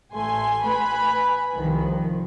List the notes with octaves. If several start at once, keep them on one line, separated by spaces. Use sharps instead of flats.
A1 A3 G#5 C6
B4 G#5 B5
C2 D#3 F3